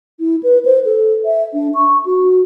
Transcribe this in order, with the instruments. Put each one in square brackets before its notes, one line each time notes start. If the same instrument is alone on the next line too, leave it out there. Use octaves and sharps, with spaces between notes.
[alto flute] E4
B4
C5
A4
E5
D4
C#6
F#4